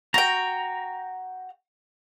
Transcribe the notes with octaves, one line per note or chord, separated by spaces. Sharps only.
F#4 G5 A#5